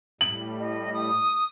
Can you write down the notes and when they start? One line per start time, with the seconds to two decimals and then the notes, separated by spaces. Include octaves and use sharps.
0.21 A2 G3 F#7
0.59 D#5
0.94 D#6